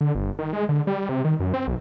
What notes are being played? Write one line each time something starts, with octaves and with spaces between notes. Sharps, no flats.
D3
G1
D#3
G#3
D3
G3
C3
D#3
F#2
C4
B1